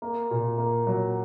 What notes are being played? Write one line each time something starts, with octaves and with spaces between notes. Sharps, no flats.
A#3
A#2
A#3
F#3